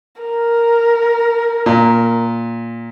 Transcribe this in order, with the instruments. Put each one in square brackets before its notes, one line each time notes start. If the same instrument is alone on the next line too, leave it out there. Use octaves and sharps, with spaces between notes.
[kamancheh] A#4
[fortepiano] A#2